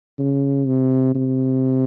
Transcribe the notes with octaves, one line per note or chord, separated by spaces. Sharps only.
C#3
C3
C3